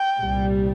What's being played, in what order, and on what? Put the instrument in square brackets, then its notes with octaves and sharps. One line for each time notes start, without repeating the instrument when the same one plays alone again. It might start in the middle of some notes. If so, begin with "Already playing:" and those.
Already playing: [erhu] G5
[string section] C2 A#2 G3